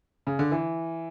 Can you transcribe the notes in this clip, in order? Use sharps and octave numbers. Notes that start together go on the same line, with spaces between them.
C#3
D3
E3